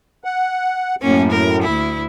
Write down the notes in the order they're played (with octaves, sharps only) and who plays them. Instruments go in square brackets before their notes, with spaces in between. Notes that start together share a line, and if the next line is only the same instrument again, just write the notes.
[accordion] F#5
[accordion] F#2 A2 [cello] A#3 C#4
[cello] A#4
D2 E4